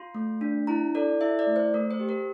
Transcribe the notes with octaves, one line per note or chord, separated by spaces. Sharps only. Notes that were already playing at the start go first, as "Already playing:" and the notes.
Already playing: F4 C6
A3
D4
E4 A#5
A4 D5
E4 E5
D5
A3
C5
A3 A#4
C5
G4
A#4